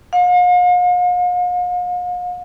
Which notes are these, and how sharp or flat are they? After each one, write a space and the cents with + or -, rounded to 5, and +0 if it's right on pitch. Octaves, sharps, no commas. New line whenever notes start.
F5 +45